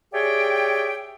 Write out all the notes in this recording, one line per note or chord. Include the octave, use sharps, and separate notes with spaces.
G4 G#4 C#5 D5 E5 G5